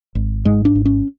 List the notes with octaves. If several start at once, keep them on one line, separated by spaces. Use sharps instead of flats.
G#1
G#2 G#3
D4
G#1
C#4